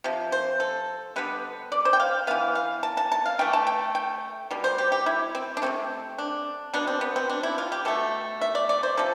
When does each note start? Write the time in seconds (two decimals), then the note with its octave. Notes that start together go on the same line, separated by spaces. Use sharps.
0.04 C3 F3
0.32 C5
0.60 A4
1.16 D3 G3 B3 B4
1.72 D5
1.85 C5
1.93 G5
2.00 F5
2.27 E3 B3 F5
2.55 F5
2.83 A5
2.97 A5
3.12 A5
3.26 F5
3.39 E3 A3 G5
3.53 A5
3.67 G5
3.95 G5
4.51 B2 G3
4.64 C5
4.78 G4
4.92 G4
5.06 E4
5.35 C4
5.57 D4
5.62 C3 F3 A3 C4
6.18 D4
6.73 B2 B3 D4
6.87 C4
7.01 B3
7.16 C4
7.29 D4
7.43 E4
7.58 F4
7.72 G4
7.85 B2 A3 A4
8.41 E5
8.55 D5
8.69 D5
8.83 C5
8.97 C3 F3 A4